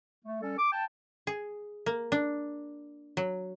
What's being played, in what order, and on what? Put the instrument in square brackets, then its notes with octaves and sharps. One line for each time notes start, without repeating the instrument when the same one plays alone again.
[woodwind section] A3
G3 C#4 A4
D6
G5 A5
[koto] G#4
A#3
D4
F#3